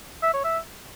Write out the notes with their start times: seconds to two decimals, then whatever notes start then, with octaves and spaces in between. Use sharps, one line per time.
0.23 E5
0.34 C#5
0.44 E5